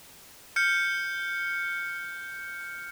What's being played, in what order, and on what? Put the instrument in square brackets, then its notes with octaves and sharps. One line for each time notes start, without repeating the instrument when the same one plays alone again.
[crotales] F6 G6 C#7